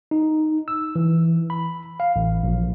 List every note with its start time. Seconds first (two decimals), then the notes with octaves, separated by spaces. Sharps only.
0.11 D#4
0.68 E6
0.96 E3
1.50 B5
2.00 F5
2.16 A1
2.43 A#1